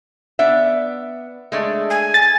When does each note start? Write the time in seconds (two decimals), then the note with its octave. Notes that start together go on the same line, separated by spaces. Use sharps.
0.39 B3 D4 E5
1.52 G#3 A3 D4
1.90 G#5
2.14 A6